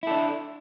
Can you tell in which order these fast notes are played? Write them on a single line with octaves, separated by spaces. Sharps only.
E4 A4 D4